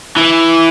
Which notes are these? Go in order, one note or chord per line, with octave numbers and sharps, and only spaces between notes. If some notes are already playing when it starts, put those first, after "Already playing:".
E3